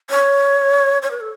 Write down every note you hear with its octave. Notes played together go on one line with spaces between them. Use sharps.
C#5
C#5
B4
A4